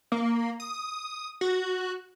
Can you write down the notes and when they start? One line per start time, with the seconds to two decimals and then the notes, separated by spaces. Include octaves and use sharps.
0.12 A#3
0.60 D#6
1.41 F#4